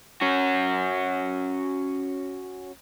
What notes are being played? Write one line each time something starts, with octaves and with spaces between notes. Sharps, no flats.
C#4 F#4